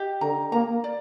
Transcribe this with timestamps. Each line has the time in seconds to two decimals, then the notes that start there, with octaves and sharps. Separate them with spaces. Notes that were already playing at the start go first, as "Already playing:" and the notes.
Already playing: G4 D#5
0.21 D3 A#5
0.52 A#3 A#5
0.84 D5